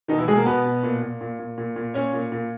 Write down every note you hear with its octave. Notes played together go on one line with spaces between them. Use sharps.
B2 D#3 D#4
E3 E4
B2 G#3 G#4
A#3 A#4
B2 B3 B4
B2
A#2
A#2
A#2
A#2
A#2
A#2
A#2 C#4 C#5
A#2
A#2